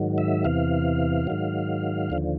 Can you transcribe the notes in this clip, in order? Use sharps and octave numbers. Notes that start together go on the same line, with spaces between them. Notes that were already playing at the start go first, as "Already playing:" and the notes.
Already playing: G#2 D#3 F#3
E5
E2 C3 E3 F5
G#2 D#3 F#3
D#2 D3 F3